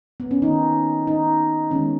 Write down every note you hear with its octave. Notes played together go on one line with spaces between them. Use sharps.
B3
C#4
D#3 A#3 D#4
D#4
D#3 G#3 B3 C#4